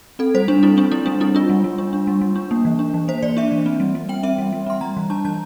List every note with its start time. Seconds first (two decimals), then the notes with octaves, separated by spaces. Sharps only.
0.19 C4 A4
0.34 G3 C5
0.48 G3 D4
0.63 C4 E4
0.77 C4 D4
0.92 G3 E4
1.06 G3 D4
1.20 C4 E4
1.35 D4 F4
1.49 G3
1.64 G3
1.78 D4
1.93 D4
2.07 G3
2.21 G3
2.36 D4
2.51 A#3
2.65 E3
2.79 D4
2.94 E3
3.08 A#3 C5
3.22 E3 D5
3.37 D4 E5
3.52 E3
3.66 C4
3.80 G3
3.95 G3
4.09 C4 G5
4.23 C4 E5
4.38 G3
4.53 G3
4.66 C4 C6
4.81 G3 A#5
4.97 E3
5.10 D4 A5
5.25 E3 A5